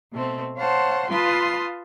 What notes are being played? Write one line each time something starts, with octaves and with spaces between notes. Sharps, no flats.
B2 A3 C4
C5 C#5 F5 F#5 A5 C6
F4 B4 F5 A5 C6 D#6